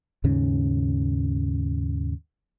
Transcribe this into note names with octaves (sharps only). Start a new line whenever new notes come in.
D#2 G#2 C#3 C#4